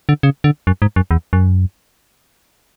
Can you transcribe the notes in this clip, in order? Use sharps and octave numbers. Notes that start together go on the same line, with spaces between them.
D3
C#3
D3
F#2
G#2
F#2
E2
F#2